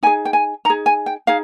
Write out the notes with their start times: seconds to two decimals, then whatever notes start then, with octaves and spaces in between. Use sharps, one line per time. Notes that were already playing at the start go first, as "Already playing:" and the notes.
0.03 D#4 G#4 G#5
0.25 G5
0.33 G#5
0.65 D#4 G#4 A#5
0.86 G#5
1.06 G5
1.27 D#4 G#4 F5